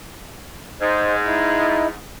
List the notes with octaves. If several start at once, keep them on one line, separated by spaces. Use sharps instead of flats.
G#2 C5 D#5
D#4 E4